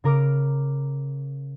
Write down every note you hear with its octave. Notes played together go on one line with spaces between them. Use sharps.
C#3 A#4 D6 F6